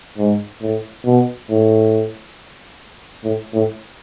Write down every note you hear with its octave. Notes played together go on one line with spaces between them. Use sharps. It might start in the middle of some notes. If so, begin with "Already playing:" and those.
G#2
A2
B2
A2
A2
A2